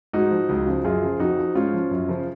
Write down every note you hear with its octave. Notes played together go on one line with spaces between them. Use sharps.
G#2 D#4 F#4
F3
C#2
C#3 F3
F#2 F4 G#4
C#3 F3
F2 D#4 F#4
F3
G#2 C#4 F4
F3
F#2
C#3 F3